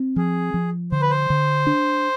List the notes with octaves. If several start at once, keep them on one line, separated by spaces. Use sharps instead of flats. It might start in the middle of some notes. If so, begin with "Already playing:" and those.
Already playing: C4
F3 G#4
F3
D3 C5
B4
C5
D3
D4